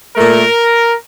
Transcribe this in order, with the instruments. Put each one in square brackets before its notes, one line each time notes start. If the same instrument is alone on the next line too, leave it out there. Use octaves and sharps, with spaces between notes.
[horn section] A#2 A3 A#4